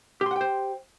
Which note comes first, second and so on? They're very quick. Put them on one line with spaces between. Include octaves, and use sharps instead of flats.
G4 C6 F#5 G5 C5